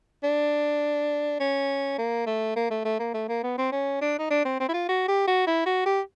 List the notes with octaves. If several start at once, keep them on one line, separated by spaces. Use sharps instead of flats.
D4
C#4
A#3
A3
A#3
A3
A3
A#3
A3
A#3
B3
C4
C#4
D4
D#4
D4
C4
C4
E4
F4
F#4
G4
F#4
E4
F#4
G4